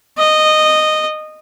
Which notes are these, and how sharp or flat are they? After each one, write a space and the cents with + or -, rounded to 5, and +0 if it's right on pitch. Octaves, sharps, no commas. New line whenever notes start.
D#5 -10